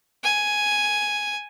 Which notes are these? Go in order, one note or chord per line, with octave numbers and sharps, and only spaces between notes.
G#5